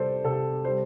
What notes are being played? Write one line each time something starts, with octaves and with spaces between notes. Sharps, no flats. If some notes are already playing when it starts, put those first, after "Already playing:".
Already playing: C3 G3 A4 C5 D5
C3 A4
G3 C5